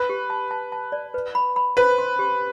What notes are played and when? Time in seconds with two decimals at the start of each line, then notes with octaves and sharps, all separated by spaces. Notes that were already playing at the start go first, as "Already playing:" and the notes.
Already playing: B4
0.09 G4
0.30 A5
0.51 A5
0.72 A5
0.92 D5
1.14 B4
1.35 B5
1.56 B5
1.77 B4 C5
1.98 C6
2.19 G4